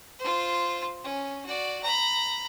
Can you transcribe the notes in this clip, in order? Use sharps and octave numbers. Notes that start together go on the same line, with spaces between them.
F4 C5
C#4
F#4 D5
A#5 B5